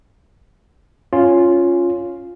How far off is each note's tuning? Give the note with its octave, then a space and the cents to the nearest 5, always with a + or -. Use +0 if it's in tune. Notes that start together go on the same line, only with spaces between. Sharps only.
C#4 +0 F4 +0